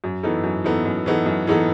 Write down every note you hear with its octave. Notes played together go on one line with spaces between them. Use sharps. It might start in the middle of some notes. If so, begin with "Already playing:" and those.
F#2
E3 B3 D#4 A4
F#2
E3 B3 D#4 A4
F#2
E3 B3 D#4 A4
F#2
E3 B3 D#4 A4